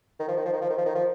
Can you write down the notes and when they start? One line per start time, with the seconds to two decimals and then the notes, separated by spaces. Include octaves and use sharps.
0.20 D#3
0.28 F3
0.36 D#3
0.45 F3
0.53 D#3
0.61 F3
0.70 D#3
0.78 F3
0.86 D#3
0.95 F3